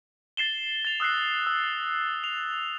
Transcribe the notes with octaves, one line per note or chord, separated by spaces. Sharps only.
A6 C7 E7 G7
A6 F7
D#6 E6 F#6 A#6 C7
E6
F7